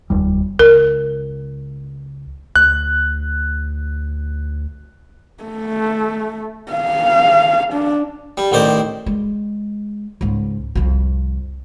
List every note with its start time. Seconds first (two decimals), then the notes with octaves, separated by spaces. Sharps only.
0.10 F1 D#2 G3
0.59 C#2 A#4
2.56 D2 F#6
5.44 A3
6.73 F5
7.73 D4
8.37 G3
8.52 A1 A2 D#3 C5 D5
9.06 G#3
10.21 C#2 G#2
10.75 C2 F2